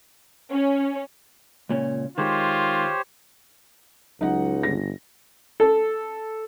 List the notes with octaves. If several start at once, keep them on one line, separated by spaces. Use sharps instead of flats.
C#4
C#2 A#2 C#4
D#3 G#3 F4 G4 C5 C#5
C#2 F#3 D#4 F#5
G1 A#6
A4